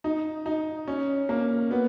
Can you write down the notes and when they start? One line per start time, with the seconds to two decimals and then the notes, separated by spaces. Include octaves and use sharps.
0.04 D#4
0.46 D#4
0.88 C#4
1.29 A#3
1.71 B3